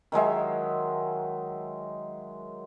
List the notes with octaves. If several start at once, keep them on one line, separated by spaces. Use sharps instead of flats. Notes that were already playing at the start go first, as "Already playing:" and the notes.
D#3 F#3 G#3 E5